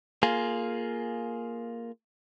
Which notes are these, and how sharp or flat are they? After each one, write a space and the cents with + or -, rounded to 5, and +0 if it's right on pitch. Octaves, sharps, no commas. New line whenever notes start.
A#3 +0 F4 +0 G#4 +10